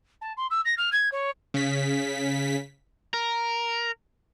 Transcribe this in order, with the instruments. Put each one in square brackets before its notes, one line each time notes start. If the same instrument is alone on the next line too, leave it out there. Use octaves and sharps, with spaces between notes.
[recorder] A5
C6
E6
A#6
F6
G#6
C#5
[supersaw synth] C#3 B6
[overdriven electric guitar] A#4